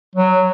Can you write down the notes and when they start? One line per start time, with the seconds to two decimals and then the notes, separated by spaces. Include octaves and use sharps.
0.15 F#3